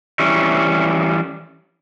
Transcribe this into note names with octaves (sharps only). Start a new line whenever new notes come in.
E3 G3 C#4